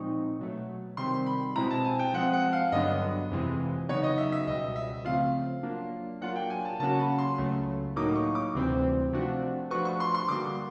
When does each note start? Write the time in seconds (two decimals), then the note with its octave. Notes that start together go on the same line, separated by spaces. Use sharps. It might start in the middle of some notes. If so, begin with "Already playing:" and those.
Already playing: A#2 F3 G#3 C4 D#4 C#6
0.39 B2 F#3 A3
0.97 C3 D#3 G3 C4 C6
1.26 B5
1.56 B2 G#3 C4 E4 A#5
1.71 A5
1.85 G#5
1.99 G5
2.14 F3 G#3 C4 F#5
2.33 F#5
2.53 F5
2.72 G2 D3 F#3 B3 D4 D#5
3.31 F2 C3 E3 G#3
3.89 C#3 F#3 B3 D#4 C#5
4.03 D#5
4.18 E5
4.32 E5
4.47 C#2 B2 G3 D#5
4.76 E5
5.05 C#3 F3 A3 C4 F4 F5
5.63 F#3 A#3 D4 F4
6.21 F#3 A#3 D4 F4 F#5
6.36 G5
6.50 G#5
6.65 A5
6.80 C#3 F#3 A#3 C#4 F#4 A5
6.99 B5
7.18 C6
7.38 C#2 C#3 F#3 A3
7.96 A2 F#3 A#3 D#4 D6
8.16 C#6
8.35 D6
8.54 D2 C3 E3 G3 C4
9.13 C3 F3 A3 D4 F#4
9.71 F3 A3 D4 F#4 B4 C#6
9.85 C#6
10.00 C6
10.14 C6
10.28 D3 G3 A#3 D4 F#4 D6